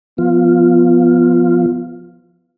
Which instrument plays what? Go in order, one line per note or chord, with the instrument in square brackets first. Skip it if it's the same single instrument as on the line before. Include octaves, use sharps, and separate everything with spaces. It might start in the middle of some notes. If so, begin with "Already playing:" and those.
[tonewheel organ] F3 F4 [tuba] B3